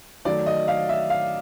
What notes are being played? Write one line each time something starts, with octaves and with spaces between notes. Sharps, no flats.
D#3 F#3 A3 D5
D#5
F5
E5
F5